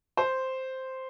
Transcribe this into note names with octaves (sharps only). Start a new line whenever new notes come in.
C5